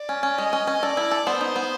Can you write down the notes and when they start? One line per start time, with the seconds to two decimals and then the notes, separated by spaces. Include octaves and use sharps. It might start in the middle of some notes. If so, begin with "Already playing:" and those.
Already playing: D5
0.09 C#4
0.23 C#4
0.38 G#3 D#5
0.53 C#4
0.67 C#4
0.82 A4 D5
0.97 E4
1.11 A4
1.27 B3 C5
1.41 D#4
1.56 B3